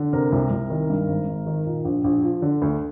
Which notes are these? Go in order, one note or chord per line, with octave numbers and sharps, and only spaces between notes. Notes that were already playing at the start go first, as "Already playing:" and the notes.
Already playing: D3
C3 A#4
C2
C2
D#3
G2
G#1
G#1
D#3
A#2
A#1
A#1
F3
D3
D2